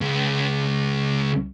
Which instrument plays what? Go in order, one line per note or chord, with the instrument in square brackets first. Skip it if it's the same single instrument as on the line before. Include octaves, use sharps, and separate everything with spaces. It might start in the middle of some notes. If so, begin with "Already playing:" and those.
[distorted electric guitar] C#2